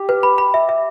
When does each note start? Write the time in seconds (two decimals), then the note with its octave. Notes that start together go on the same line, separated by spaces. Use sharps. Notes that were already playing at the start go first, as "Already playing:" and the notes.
Already playing: G4
0.09 B4
0.23 B5
0.38 B5
0.54 E5
0.69 E5